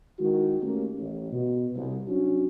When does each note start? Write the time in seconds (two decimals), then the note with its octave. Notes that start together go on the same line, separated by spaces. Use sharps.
0.19 D#3 G#3 E4 F#4
0.61 A3 A#3 C#4 G4
0.98 A1
1.31 B2
1.75 C2
2.07 F#3 C#4 D4 F#4